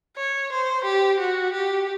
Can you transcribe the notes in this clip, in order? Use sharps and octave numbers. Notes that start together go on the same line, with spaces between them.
C#5
C5
G4
F#4
G4